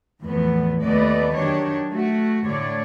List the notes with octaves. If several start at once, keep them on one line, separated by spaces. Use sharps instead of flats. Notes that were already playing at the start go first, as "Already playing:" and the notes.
E2 A2 F3 B3
D#2 A3 B3 B4 D5 D#5
D#3 F#3 D4 G4 C#5
A3 F#4
A2 D3 C#5 D5